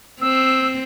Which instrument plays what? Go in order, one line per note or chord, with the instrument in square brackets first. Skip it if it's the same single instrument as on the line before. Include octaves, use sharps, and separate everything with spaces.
[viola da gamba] C4 [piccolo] E6